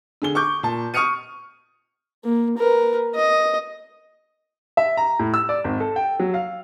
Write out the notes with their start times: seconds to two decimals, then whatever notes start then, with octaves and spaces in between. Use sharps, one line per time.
0.22 D3 G#4 G7
0.35 C#6 D6 G6
0.63 A#2 A5
0.94 C#6 D#6 F6 C#7 D#7
2.24 A#3
2.57 A#4 B4
3.15 D#5
4.77 E5
4.97 A#5
5.19 A2
5.34 E6
5.49 D5
5.64 G#1
5.80 A4
5.96 G5
6.19 F#3
6.34 F5